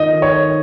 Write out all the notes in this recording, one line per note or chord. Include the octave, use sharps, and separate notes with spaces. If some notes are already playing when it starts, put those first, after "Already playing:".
Already playing: D#3 D#5
C#5